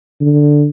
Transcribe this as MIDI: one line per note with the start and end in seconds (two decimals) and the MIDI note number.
0.21 0.68 50